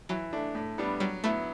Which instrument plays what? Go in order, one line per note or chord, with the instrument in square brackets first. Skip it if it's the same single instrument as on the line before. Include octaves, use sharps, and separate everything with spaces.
[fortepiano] E3 [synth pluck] F#3
[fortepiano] A3 D4
A2
G3 B3 D4
[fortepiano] F#3 [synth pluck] G3
[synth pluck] A3 [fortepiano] B3 E4